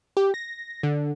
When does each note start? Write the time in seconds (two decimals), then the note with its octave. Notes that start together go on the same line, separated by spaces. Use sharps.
0.17 G4
0.34 A#6
0.83 D3